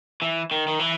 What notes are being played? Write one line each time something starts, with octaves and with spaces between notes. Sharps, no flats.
E3
D#3
D#3
E3